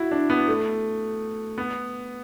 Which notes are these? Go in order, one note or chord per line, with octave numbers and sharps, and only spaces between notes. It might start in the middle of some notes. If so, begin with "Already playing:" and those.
Already playing: E4 F#4
D4
B3
A3
B3